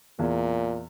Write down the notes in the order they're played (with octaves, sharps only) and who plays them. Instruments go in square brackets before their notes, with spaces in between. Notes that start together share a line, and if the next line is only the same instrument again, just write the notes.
[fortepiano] E2 [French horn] A#2